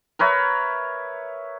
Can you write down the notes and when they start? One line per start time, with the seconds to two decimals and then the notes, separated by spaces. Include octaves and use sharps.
0.19 A#4 B4 C#5 E5